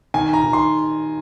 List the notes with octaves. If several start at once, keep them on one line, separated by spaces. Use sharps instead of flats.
D#3 G#5
A#5
D#3
C6